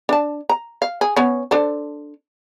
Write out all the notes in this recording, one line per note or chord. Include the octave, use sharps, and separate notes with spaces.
D4 A5
A#5
F5
G#4
B3 C#4
D4 A4 C5